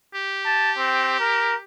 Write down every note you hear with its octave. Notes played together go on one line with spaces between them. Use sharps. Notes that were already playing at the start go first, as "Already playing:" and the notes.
G4
A5
C4
A#4